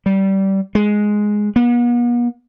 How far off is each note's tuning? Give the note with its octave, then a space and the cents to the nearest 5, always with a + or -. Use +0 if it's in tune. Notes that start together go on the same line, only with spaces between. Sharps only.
G3 -20
G#3 +5
B3 -45